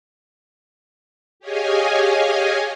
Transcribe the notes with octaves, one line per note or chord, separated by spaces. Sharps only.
G4 G#4 C#5 D#5 F5 G#5